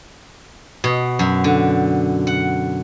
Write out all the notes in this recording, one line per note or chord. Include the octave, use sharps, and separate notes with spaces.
B2
F#2
D3
F#5